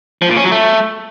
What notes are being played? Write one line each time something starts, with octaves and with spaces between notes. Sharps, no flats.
F3
A#2
C#4
F#3
A3